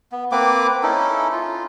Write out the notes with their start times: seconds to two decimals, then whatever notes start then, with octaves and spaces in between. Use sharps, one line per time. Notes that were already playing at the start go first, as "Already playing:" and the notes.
0.12 B3
0.32 A#3 C4 B4 D6
0.83 C#4 D#4 E4 A4
1.32 F4